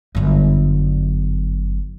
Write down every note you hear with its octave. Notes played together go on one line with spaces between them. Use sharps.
G1 F#2